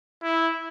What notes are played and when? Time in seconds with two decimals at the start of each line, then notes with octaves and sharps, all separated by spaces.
0.23 E4